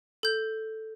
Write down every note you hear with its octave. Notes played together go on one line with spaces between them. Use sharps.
A4 G6